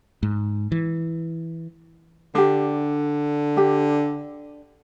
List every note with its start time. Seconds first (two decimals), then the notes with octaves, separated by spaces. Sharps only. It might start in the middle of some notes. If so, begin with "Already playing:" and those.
0.23 G#2
0.72 E3
2.35 D3 D4 G4
3.57 D4 G4